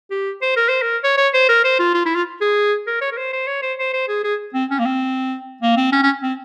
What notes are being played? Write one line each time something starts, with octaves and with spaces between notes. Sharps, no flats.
G4
C5
A#4
C5
A#4
C#5
C#5
C5
A#4
C5
F4
F4
E4
F4
G#4
A#4
C#5
A#4
C5
C5
C#5
C5
C5
C5
G#4
G#4
C4
C#4
A#3
C4
A#3
C4
C#4
C#4
C4